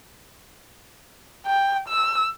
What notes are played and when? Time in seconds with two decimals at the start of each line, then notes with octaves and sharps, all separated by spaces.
1.46 G5
1.88 E6